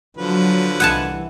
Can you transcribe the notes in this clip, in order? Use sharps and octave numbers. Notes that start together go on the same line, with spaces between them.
D3 F3 F#3 B4
C2 E3 F#5 G#5 A5